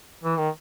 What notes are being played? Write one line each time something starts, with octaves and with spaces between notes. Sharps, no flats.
E3
D#3